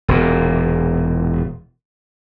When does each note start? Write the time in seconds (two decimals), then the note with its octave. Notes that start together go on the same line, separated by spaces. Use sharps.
0.08 E1 A#2